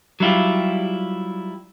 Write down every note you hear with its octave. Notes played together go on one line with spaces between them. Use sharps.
F#3 G3 E4 F4 G4